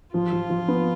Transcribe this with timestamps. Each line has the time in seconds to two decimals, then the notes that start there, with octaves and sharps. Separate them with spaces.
0.14 F3 F4
0.32 F3
0.50 F3
0.68 B3